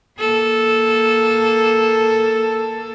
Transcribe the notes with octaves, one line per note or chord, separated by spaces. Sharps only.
A#3 A4